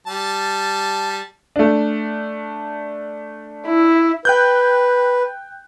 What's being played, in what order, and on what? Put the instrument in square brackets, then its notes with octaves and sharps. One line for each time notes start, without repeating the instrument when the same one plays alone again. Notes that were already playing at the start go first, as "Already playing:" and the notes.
[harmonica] G3 A5
[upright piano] A3 D4
[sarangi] E4
[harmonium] B4 [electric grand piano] G5 F#6 G6